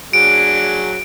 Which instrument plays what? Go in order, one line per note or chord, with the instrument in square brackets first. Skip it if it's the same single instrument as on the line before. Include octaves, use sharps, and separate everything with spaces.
[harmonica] F#3 D4 G#4 [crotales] D7